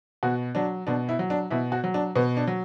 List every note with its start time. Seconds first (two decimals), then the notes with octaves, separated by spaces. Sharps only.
0.23 B2 F#4
0.55 F#3 D4
0.87 B2 D4
1.09 E4
1.19 F#3
1.30 D4
1.50 B2 E4
1.72 F#4
1.84 F#3
1.94 D4
2.16 B2 B3
2.37 D4
2.47 F#3